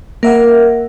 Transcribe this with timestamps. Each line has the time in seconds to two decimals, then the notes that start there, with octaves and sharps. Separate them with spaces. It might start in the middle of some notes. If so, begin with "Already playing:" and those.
0.23 A#3 A#4 E5 F#5